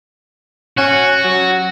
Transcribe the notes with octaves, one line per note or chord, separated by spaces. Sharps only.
C#4 F#4
F#3